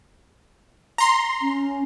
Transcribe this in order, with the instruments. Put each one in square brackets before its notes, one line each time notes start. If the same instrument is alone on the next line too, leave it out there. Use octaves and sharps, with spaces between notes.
[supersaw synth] A#5 C6
[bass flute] C#4